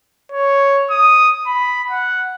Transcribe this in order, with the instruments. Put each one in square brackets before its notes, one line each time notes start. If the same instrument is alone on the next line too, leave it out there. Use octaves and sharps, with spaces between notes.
[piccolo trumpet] C#5
D#6
B5
F#5